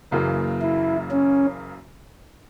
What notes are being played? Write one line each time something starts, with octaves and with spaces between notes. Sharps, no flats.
F#1 F#2 C#3 E3 A#3
E4
C#4